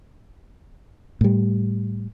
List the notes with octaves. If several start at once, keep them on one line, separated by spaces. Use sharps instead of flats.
A2 G3